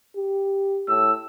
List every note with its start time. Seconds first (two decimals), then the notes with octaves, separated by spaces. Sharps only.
0.16 G4
0.88 A2 E6